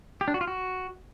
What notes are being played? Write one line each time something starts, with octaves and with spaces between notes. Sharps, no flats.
G4
D4
F#4
F4
F#4